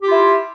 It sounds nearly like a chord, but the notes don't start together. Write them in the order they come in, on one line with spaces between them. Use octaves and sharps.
G4 F4 E4